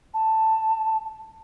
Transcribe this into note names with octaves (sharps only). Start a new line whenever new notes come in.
A5